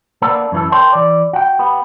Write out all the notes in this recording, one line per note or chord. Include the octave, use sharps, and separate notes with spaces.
A#3 B3 D4 A4
F#2 E3 A4
A#4 C#5 G5 A5 C6
E3 D5
F#4 G5
B3 G4